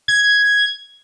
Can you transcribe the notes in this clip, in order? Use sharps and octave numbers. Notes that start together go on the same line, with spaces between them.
G#6